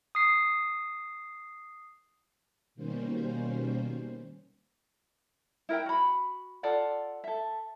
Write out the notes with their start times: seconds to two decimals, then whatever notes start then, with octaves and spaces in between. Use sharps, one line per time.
0.15 D#6 C7
2.75 B2 D#3 G3 A#3 C#4 C5
5.69 E4 A#4 E5 G5
5.86 F#4 B5
6.63 F4 A4 D5 F#5
7.24 A4 E5